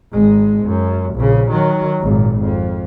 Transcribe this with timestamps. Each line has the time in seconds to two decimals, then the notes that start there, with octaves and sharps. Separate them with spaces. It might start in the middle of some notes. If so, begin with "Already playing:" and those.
0.12 G#1 G#3
0.64 F#2
1.15 A#1 C#3
1.51 D#3 F#3
2.00 G#1 A#2
2.42 F2